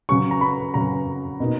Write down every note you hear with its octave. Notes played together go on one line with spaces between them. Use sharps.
C#3 F#3 C#4 C#6
A#5
B5
C#3 F#3 C#4 A#5
B2 A#3 D#4